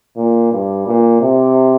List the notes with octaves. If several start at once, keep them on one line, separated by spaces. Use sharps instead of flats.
A#2
G2
A#2
C3